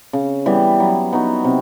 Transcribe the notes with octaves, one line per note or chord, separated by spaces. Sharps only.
C#3
E3 G3 B3
F#3
B3 D#4 F#4
C3